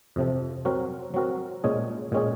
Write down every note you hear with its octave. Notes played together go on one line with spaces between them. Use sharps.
F2 C3 F3
F#3 C4 F#4 A#4
F#3 C4 F#4 A#4
A#2 G#3 C#4 G#4
A#2 G#3 C#4 G#4